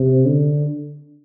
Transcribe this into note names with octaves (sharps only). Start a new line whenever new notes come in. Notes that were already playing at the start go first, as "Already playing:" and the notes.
Already playing: C3
D3